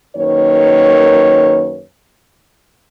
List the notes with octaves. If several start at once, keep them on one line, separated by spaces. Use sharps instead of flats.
F#2 D#3 A#3 B4 C#5